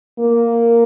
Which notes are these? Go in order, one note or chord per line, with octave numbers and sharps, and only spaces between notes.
A#3